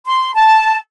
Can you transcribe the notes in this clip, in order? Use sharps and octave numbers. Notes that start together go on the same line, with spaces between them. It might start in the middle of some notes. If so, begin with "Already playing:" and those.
C6
A5